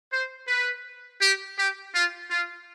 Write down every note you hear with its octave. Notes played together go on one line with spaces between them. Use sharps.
C5
B4
G4
G4
F4
F4